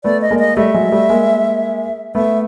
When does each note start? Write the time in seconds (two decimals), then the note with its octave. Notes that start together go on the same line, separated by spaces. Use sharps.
0.04 A3 B3 D5
0.22 D#5
0.31 G#3 A#3
0.39 D#5
0.57 G3 A3 E5
0.74 F#3 G#3
0.92 G3 A3
1.09 G#3 A#3
2.15 A3 B3 E5